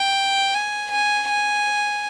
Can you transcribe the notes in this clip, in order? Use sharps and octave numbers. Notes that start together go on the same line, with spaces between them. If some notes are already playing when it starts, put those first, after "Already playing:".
Already playing: G5
G#5
G#5
G#5